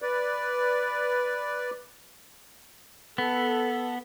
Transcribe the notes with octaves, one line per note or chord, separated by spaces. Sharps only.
B4 D5
B3 A4